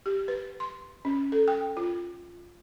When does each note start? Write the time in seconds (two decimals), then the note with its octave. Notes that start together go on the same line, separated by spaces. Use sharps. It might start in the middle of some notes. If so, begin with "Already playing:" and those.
0.06 G4
0.28 B4
0.60 C6
1.05 C#4
1.32 A4
1.48 G5
1.77 F4